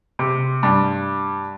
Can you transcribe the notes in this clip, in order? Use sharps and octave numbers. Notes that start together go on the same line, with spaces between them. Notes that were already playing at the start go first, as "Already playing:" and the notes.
C3
G2